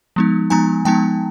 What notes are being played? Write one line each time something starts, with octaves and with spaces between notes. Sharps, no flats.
F3 G#3 B3 D#4
F3 G#3 B3 D#4 G#5 A#5
F3 G#3 B3 D#4 G5 A5